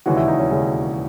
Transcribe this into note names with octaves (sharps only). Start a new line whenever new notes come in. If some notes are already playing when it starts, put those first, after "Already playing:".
E1 D#2 C#3 E3 F#4
E4
D#4
C#4
E1 D#2 C#3 E3